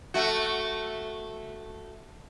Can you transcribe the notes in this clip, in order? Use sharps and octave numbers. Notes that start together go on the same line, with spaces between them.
A3 F#4